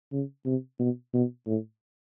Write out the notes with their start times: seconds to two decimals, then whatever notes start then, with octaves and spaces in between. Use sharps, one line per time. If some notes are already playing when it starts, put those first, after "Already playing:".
0.12 C#3
0.46 C3
0.80 B2
1.14 B2
1.47 A2